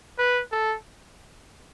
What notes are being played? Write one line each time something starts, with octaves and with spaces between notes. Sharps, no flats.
B4
A4